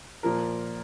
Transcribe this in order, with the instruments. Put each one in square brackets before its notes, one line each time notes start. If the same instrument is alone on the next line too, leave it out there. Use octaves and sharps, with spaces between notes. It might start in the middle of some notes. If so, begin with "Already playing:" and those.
[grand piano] A#2 F3 A#4